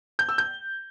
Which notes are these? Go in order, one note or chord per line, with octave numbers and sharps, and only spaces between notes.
G6
E6
G6